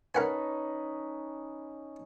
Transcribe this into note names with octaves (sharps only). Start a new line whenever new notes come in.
C#4 D#4 A#4 B4 F#5 G#5 A5